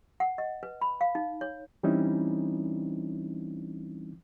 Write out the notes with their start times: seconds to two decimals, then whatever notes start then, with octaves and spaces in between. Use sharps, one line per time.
0.20 F#5
0.38 D#5
0.63 B4
0.81 B5
1.01 F5
1.15 D#4
1.41 C#5
1.83 E3 G3 C4 C#4 D#4 E4